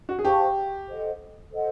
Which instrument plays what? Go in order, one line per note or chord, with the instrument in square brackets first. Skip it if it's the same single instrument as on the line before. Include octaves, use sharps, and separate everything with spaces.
[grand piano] F#4
G#4
[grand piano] G4 [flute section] C5 F5 A5 C#6
[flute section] A4 C5 D#5 F#5
A4 C5 D#5 F#5